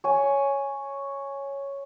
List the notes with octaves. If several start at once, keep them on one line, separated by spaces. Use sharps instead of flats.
C#5 G#5